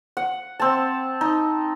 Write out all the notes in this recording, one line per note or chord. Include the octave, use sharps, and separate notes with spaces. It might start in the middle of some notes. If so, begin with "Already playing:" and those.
F#5
C4 A5
D#4